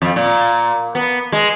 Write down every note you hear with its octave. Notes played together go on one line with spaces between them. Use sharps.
F2
A#2
B3
G#3